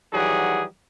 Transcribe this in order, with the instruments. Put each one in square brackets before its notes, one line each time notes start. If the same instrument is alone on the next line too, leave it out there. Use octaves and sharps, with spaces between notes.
[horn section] D#3 E3 F#3 G3 G#4 F#5